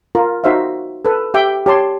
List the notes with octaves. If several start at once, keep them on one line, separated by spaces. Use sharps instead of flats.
F4 A#4
D#4 F#4 C5 E5 F5
A4 B4
G4 E5 G5 D6
G4 C#5 A5 C6